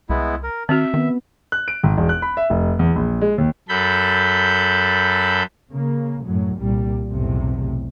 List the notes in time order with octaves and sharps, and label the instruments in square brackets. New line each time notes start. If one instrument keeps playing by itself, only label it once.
[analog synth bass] C2 [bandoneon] G#3 B3 E4
[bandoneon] A#4
[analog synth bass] D#3 [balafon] C4 F#4 [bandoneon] E5
[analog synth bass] D#3 [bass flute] B3
[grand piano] F#6
D7
G#1
E1
F#6
B5
E5
F1
E2
A#1
G#3
D#2
[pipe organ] F#2 A4 B5 G6
[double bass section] C#3 A#3
F#2 A2 F#3
C2 A#2 G3
B1 E2 A2 C3